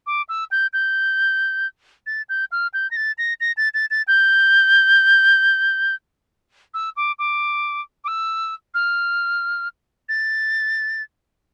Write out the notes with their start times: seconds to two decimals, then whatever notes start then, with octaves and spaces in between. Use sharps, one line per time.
0.07 D6
0.29 E6
0.51 G6
0.73 G6
2.07 A6
2.29 G6
2.52 F6
2.74 G6
2.91 A#6
2.96 A6
3.18 A#6
3.40 A#6
3.57 A6
3.74 A6
3.91 A6
4.08 G6
6.74 E6
6.97 D6
7.19 D6
8.04 D6
8.08 E6
8.74 F6
10.09 A6